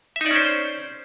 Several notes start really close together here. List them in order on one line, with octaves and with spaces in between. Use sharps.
E5 D#4 D5 C#4 C5